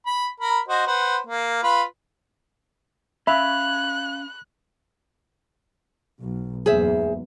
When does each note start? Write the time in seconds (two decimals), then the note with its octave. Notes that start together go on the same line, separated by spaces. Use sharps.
0.06 B5
0.40 A#4 B5
0.68 F#4 C5 D#5
0.87 B4 C5 F#5
1.27 A#3
1.63 F4 B4 B5
3.27 C#4 E5 F5 B5 F#6
6.19 B1
6.66 F#1 E2 G#2 G#4 C5 E5